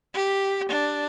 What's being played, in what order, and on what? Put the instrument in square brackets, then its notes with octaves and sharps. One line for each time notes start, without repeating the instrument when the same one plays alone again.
[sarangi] G4
D4